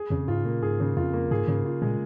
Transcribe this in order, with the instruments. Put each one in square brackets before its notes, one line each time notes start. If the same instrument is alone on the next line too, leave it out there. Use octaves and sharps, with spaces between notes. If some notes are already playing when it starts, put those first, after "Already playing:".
Already playing: [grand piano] G#4
[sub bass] F2 [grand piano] C#3
[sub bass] G#2 [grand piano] F4
[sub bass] A#2 [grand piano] A#3
[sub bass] G#2 [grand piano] G#4
[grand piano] C#3
[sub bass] F2 [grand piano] F4
[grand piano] A#3
[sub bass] G#2 [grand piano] G#4
[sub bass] G#2 [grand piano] C#3
[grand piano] F4
[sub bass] A#2 [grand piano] G#3